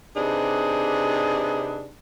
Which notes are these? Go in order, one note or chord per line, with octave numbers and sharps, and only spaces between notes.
C3 D4 D#4 G4 G#4 B4